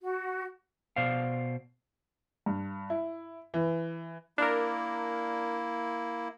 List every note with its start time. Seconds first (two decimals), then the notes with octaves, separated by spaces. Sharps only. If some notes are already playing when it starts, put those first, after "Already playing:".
0.01 F#4
0.96 B2 C5 D5 F5
2.46 G2
2.90 E4
3.54 E3
4.38 A#3 D4 E4 A#4